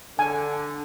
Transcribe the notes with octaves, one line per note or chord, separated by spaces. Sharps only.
D3 G#5